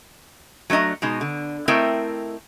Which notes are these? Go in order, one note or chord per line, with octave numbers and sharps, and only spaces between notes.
F#3 A3 D4 D#5 A#5
B2 G#3 D#4
D3
A3 C4 E4 A#4 D#5 G5